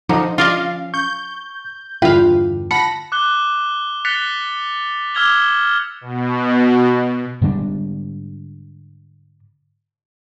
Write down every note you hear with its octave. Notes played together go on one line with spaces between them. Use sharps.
D3 F3 D#4
F3 C#4 F4 D5 D#5 F5
C#6 G6
E2 G2 D3 E4 F4 B4 F5 G5
F#5 A5 B5 A#6 C#7
D6 F#6 G7
F#6 A6 B6 C#7 F7 G7
D6 E6 F6 G#6 F7 G7
B2
G#2 D3 G3 D4